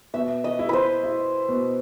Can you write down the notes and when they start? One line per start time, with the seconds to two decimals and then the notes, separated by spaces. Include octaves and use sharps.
0.14 B2 E5
0.44 D#5
0.59 E4
0.69 B4 C5
1.04 E4
1.49 B2